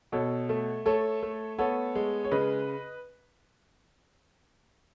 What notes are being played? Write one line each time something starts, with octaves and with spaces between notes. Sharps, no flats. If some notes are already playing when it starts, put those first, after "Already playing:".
B2 A4 C#5
A3
A3 A4 C#5
A3
B3 A4 C#5
G#3
C#5
C#3 B4 D#5